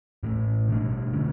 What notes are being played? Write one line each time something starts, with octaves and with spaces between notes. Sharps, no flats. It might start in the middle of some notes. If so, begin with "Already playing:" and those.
A2 E3 A3
B2 A3 D4
D3 A3 C#4